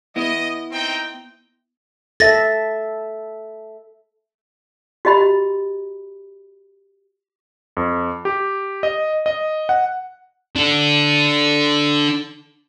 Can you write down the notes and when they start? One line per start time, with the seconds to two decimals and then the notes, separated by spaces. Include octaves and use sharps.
0.16 B3 E4 D#5
0.72 C4 D#4 G5
2.20 A4 E5 A6 A#6
5.05 F#4 G4 D#5 A#5 B5
7.77 F2
8.25 G4
8.83 D#5
9.26 D#5
9.69 F#5
10.56 D4 A4